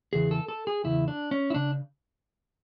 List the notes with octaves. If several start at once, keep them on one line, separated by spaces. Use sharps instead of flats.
E2 C#3 E3 G#4
A4
A4
G#4
E2 C#3 E4
D4
C#4
E4
C#3 D4